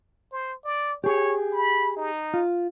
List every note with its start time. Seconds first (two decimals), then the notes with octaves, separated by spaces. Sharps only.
0.32 C5
0.64 D5
1.04 G4 G#4 C#5
1.53 B5
1.97 D#4
2.34 F4